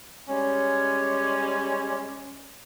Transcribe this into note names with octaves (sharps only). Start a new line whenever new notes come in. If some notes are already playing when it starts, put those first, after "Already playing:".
G3 G#3 C#4